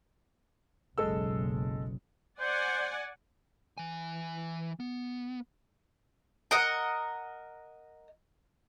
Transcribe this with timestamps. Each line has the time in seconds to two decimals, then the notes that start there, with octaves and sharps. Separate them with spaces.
0.98 F#1 B1 G#3 A4 E6
2.40 C5 D5 F#5 G#5
3.78 E3 G#5
4.80 B3
6.51 A#4 D#5 F#5